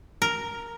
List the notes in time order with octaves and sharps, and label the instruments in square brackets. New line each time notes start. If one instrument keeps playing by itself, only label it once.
[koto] A#4